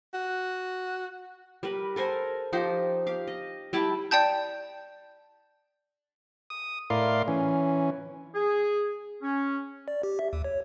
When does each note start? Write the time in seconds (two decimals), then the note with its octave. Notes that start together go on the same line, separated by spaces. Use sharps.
0.14 F#4
1.63 G3 A#4 B4
1.96 A4 A#4 C5 G#5
2.53 F3 D#4 G4 C5
3.07 G4 F5
3.27 D#5
3.73 G3 E4 G5 A5
4.11 D5 G5 A5 G6
6.50 D#6
6.90 A2 E4 A#4 D5 F5 C6
7.28 E3 C#4
8.34 G#4
9.22 C#4
9.88 D5
10.03 G4
10.19 E5
10.33 D#2
10.44 C#5